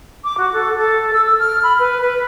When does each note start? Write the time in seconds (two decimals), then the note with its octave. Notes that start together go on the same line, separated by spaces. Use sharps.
0.24 D6
0.38 F#4
0.53 A4
0.77 A4
1.13 E6
1.26 E6
1.39 F6
1.63 B5
1.79 B4
2.01 B4